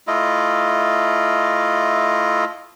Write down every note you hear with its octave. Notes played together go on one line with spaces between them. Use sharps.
A3 E4 F4 D#5